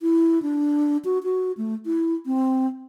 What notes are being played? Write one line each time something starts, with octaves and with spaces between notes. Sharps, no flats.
E4
D4
F#4
F#4
A3
E4
C4